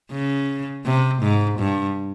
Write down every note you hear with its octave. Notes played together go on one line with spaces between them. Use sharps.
C#3
C3
G#2
G2